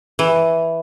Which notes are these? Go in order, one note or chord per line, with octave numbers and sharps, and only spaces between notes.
E3